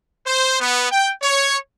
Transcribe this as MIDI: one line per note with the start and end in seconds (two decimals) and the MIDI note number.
0.27 0.59 72
0.60 0.91 59
0.92 1.11 79
1.22 1.57 73